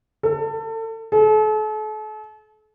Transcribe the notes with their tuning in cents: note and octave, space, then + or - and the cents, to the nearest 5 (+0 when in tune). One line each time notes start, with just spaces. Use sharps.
A4 +30
A4 -40